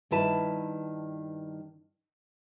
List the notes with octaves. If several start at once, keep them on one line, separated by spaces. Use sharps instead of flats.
G2 D#3 E4 B4 A5